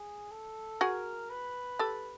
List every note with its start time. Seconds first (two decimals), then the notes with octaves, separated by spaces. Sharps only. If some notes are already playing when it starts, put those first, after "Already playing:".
Already playing: G#4
0.31 A4
0.80 F#4 G#4 A#4
1.30 B4
1.79 G4 A4